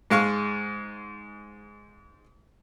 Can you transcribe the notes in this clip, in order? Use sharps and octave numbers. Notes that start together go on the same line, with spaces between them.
G#2 G#3 F5 C#6